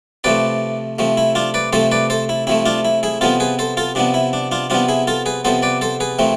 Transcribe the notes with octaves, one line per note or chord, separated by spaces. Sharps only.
C3 F3 A3 B4 D5
C3 F3 A3
E4
D4 F4
B4 D5
C3 F3 A3 A4 C5
B4 D5
A4 C5
E4
C3 F3 A3 E4
D4 F4
E4
E4 G#4
C3 F3 B3 F4 A4
G#4 B4
A4 C5
F4 A4
C3 F3 B3 D4
E4
D4
D4 F4
C3 F3 B3 D4 F4
E4 G#4
F4 A4
G#4 B4
C3 F3 B3 A4 C5
B4 D5
A4 C5
G#4 B4
C3 F3 A3 C4